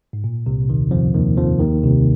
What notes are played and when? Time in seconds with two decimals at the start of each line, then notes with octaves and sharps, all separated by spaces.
0.13 G#2
0.24 A#2
0.46 C2 C3
0.68 D#2 D#3
0.91 F2 F3
1.14 D#2 D#3
1.37 F2 F3
1.59 D#2 D#3
1.83 C2 C3